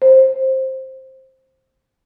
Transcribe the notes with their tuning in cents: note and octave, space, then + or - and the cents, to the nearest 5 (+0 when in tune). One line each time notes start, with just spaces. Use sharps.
C5 +10